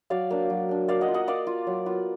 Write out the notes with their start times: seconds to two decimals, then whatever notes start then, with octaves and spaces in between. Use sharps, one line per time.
0.10 F#3 D5 F5
0.30 A#3 D4
0.50 F#3
0.69 A#3 D4
0.88 A#3 D5 F5
1.01 D#5 F#5
1.08 F4
1.14 D#5 F#5
1.27 A#3 D5 F5
1.47 F4
1.67 F#3
1.86 B3 F4